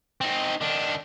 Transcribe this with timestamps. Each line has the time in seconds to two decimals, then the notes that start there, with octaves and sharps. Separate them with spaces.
0.21 C4 D#4
0.61 D#3 D4